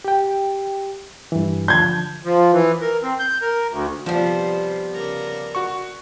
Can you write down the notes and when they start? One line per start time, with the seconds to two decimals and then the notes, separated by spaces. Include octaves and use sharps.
0.04 G4 G5
1.32 G2 E3
1.68 D3 F3 A5 G6 G#6
2.25 F3
2.52 E3
2.81 A#4
3.03 C4
3.19 G6
3.42 A#4
3.71 D2
4.06 C3 F3 G3 B3 C5
4.94 C#3 A#4 D5
5.55 F#4 C#6